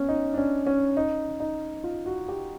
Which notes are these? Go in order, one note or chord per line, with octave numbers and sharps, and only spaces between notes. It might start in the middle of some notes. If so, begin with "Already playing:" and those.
Already playing: B3 C#4
D#4
D4
C#4
C#4
D#4
D#4
F4
F#4
G4